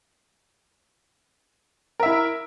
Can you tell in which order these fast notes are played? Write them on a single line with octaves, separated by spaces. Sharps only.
A#4 E5 E4